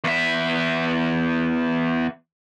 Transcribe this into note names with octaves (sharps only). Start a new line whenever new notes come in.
E2 E5